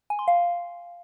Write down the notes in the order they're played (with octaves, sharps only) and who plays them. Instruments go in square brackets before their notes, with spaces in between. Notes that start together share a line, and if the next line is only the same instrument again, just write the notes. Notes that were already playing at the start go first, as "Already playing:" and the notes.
[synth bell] G#5
C6
F5